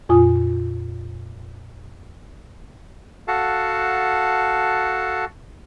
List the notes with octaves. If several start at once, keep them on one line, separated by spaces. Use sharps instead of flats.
F2 A#2 F4 G#5 D#6
F#4 A4 F5 F#5 A5